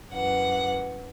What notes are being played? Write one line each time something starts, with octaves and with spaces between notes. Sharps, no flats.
F#2 E3 F#5